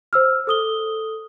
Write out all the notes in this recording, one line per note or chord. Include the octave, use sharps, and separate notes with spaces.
C5 E6 F6
A4 D#6 G7